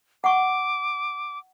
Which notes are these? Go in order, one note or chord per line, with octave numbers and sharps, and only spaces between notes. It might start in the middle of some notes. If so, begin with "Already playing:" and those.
F#5 C#6 D6